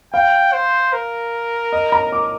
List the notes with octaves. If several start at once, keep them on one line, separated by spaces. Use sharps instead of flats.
F5 G5
C5
A#4
D#5
A#5
D6